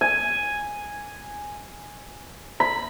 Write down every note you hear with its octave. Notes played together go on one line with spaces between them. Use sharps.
G#5
B5